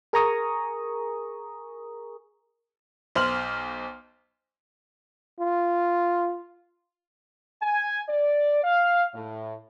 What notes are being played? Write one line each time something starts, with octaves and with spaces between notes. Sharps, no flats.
G#4 A#4 G#5 A#5 C#6 D#6
B1 C5 C6 F6 F#7
F4
G#5
D5
F5
A2